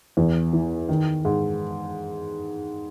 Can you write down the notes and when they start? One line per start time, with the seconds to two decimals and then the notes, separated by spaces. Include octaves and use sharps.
0.17 E2
0.53 E3
0.89 D#3
1.25 G#2